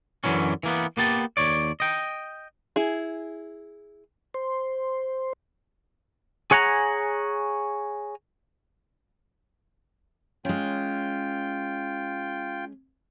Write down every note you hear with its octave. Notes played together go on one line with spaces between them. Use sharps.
F#2 D3 E3 F#3 C#4
E3 A#3 B3
A#3 B3 G4 A5
D#2 C#5 D5
D#5 G5
E4 G#4
C5
G#4 C#5 F#5 G#5 A#5
G#3 C#4 F4 G5